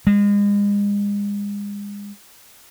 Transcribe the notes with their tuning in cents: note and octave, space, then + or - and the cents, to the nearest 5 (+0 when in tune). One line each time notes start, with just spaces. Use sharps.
G#3 -35